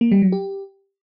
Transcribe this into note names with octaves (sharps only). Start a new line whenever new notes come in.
A#3
G3
F#3
G4